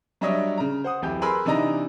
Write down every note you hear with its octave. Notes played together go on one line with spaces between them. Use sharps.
F#3 G3 D4 C#5 D#5 E5
C#3 A#5
C5 F#5 D#6
D1 F2 E3 G4 G6
G#4 A#4 B4 B5 C6 E6
C3 E3 D4 D#4 D#5 A#5